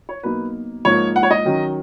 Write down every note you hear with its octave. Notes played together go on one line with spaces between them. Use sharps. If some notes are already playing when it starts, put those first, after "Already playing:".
C#5
B2 F#3 A#3 D#4 B4
G#2 F3 A#3 D#4 C#5
F#5
C#5
D#5
D#3 F#3 C#4